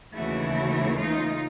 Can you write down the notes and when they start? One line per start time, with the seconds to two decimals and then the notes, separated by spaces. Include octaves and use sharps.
0.14 D#2 C#3 E3 A3 E4 F#4
0.98 D#4 F4